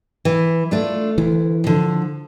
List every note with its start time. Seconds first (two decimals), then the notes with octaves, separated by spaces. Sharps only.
0.25 E3
0.71 A3 D4 F4
1.18 D2 E3
1.64 D3 F3